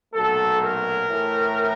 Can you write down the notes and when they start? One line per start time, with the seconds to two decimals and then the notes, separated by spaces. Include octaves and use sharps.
0.14 B1 A#2 F#3 A3 A4
0.62 A#4
1.09 A2 E3 A3